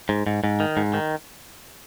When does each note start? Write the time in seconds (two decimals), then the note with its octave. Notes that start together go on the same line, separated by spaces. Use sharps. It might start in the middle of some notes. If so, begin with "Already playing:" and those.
0.09 G#2
0.26 G#2
0.44 G#2
0.60 D#3
0.77 G#2
0.94 D#3